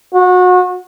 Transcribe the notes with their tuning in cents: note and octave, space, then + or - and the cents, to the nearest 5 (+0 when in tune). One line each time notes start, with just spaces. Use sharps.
F#4 -30